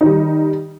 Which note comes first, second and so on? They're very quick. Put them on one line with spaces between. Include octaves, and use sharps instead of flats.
D#4 D#3 G3